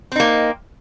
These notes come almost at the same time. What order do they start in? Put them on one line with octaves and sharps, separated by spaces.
C4 D#4 A#3